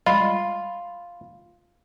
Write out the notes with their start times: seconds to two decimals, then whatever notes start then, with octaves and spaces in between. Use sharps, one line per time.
0.06 G3 G#3 F4 B5